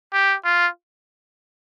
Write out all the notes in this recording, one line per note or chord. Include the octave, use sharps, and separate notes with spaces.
G4
F4